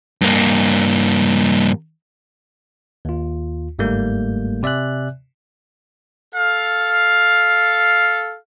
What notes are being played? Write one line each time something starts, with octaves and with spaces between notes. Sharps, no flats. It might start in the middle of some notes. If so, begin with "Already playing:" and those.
G2 A#3
D#2 F4
G1 G#2 G3 A3 A#3 G6
C3 D5 E5 G#5 F#6
A4 F5